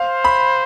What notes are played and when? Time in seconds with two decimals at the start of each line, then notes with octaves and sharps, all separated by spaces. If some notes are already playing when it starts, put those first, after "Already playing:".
Already playing: C5 F5
0.24 B5